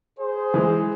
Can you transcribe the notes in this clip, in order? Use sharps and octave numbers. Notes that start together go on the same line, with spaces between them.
G#4 C5
E3 G#3